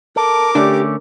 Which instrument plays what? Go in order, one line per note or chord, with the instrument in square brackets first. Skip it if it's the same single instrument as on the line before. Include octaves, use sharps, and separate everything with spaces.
[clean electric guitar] A4 [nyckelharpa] A#4 D6
[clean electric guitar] D3 A3 C#4 [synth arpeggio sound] D4 [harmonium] G4